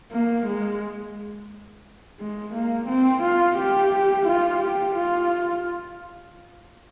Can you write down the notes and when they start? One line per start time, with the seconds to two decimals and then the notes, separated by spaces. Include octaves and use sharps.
0.12 A#3
0.46 G#3
2.19 G#3
2.53 A#3
2.88 C4
3.22 F4
3.58 G4
4.26 F4
4.60 G4
4.95 F4